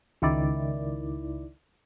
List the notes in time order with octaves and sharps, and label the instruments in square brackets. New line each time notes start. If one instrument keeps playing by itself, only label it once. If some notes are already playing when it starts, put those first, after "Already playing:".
[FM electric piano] C#2 D#3 E4 D5